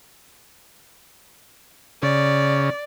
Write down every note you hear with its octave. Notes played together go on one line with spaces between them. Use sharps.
C#3 D5